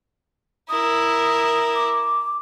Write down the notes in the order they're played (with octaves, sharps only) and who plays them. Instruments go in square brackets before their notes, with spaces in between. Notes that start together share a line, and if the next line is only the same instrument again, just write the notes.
[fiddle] E4 A#4 [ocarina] D#6
[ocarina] D6